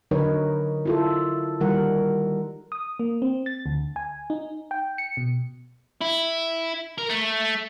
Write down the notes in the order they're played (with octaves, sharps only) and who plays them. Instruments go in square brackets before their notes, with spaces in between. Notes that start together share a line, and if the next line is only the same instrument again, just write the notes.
[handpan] D3 F#3 D#4 A#4 B4 C#5
E4 F4 A4
D#3 G3 A#4 F#5
[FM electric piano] D#6
A#3
C4
A6
D2
G#5
D#4
G5
C#7
B2
[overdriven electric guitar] E4
A#4
A3